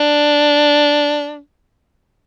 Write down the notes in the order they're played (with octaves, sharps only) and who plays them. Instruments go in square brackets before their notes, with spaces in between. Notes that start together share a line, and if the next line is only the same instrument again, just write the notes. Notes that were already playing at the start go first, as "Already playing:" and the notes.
Already playing: [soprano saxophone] D4